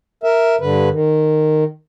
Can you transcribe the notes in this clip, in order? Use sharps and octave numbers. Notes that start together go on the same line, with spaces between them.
A#4 E5
G2 D3 B4
D#3